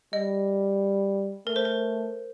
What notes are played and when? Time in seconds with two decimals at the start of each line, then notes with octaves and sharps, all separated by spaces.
0.13 G3 D#5
1.47 A3 A#4
1.56 C5
1.65 A#4